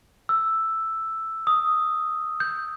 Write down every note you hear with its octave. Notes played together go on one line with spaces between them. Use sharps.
E6
D#6
G6